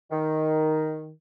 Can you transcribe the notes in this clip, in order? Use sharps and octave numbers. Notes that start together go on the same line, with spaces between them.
D#3